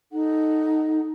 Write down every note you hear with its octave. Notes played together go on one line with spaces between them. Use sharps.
D#4 A4 F#5